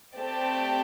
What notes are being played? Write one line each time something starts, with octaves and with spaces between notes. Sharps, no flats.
A3 C4 G4 D5 A5